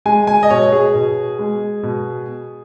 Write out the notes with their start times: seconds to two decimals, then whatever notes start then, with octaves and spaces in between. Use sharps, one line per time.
0.06 G#3 G#5
0.27 G#5
0.43 D#5
0.50 B2 C#5
0.72 G#4
0.95 B2
1.39 G#3
1.83 B2